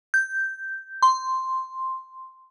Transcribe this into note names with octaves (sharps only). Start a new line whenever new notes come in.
G6
C6